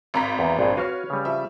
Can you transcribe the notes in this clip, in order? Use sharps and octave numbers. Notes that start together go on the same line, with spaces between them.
G#1 A#5 B6
E2
A#1 G2 G#4
F#4 B4 C#5 F5 F6
C#3 G3
F3 E5